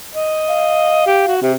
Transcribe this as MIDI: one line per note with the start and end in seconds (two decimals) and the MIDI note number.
0.14 1.04 75
0.48 1.35 77
1.06 1.23 67
1.27 1.39 66
1.42 1.54 48
1.42 1.52 67